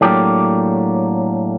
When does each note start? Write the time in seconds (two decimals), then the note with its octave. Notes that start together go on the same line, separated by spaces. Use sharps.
0.01 A2 F#3 A#3 D4 G4